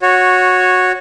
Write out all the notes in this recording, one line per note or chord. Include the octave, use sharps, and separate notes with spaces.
F#4 C#5